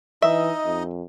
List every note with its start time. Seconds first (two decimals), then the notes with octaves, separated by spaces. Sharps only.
0.22 E3 D#4 D#5 E5
0.66 F2